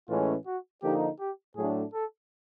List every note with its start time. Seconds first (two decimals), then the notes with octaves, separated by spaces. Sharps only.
0.08 A2 E3 G#3 C#4 F4
0.46 F#4
0.83 D3 F3 A#3 D#4 G4
1.20 G4
1.56 A2 F#3 A3 D4 G#4
1.94 A4